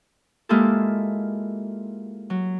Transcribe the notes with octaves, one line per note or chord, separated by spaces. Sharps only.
G#3 A#3 E4 F4 G4 A4
F#3